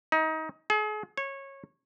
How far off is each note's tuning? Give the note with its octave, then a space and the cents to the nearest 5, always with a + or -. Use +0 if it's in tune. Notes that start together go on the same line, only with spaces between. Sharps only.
D#4 +25
G#4 +40
C#5 -20